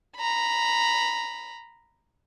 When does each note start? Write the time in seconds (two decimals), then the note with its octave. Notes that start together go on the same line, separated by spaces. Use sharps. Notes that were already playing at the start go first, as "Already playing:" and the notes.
0.17 A#5 B5